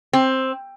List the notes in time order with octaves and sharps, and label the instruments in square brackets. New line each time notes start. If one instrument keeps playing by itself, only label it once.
[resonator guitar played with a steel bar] C4